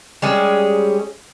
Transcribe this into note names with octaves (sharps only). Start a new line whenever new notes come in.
G3 G#3 C#4 G#4